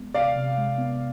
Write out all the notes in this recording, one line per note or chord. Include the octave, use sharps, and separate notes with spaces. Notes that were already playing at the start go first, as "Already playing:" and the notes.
Already playing: G#3 B3
C3 D5 F5
C3
G#3
B3